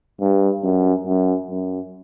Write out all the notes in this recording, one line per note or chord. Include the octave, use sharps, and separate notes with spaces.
G2
F#2
F#2
F#2